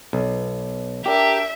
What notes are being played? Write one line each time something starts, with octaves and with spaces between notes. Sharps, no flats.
B1
D4 G4 A#4 E5